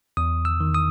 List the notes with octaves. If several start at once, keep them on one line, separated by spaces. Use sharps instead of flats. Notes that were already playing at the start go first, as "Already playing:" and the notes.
E2 D#6
E6
D#3
D#6